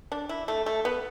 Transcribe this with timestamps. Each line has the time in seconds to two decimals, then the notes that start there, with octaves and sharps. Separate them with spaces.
0.12 D4
0.29 E4
0.48 A3
0.66 A3
0.85 B3